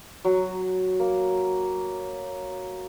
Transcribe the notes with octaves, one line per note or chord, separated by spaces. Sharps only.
F#3
A#3